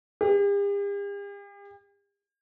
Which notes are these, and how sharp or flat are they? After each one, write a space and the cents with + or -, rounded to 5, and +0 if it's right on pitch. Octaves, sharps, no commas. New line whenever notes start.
G4 +45